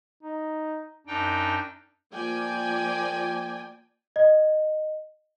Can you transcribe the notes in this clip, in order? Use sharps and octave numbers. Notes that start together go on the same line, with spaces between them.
D#4
F#2 D4 D#4 G5
F3 A#3 D5 G5 G#5
D#5